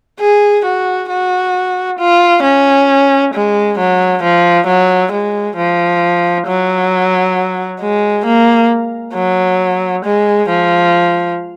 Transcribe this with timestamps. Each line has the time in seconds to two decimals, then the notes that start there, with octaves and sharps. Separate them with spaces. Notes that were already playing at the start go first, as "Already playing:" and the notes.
0.20 G#4
0.65 F#4
1.10 F#4
1.99 F4
2.44 C#4
3.34 G#3
3.78 F#3
4.23 F3
4.67 F#3
5.12 G#3
5.57 F3
6.47 F#3
7.81 G#3
8.26 A#3
9.15 F#3
10.05 G#3
10.49 F3